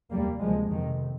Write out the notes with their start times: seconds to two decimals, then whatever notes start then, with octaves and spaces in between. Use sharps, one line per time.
0.12 F1 D#2 G3 A#3
0.40 D2 C3 F3 G#3
0.70 F1 F2 C3 D#3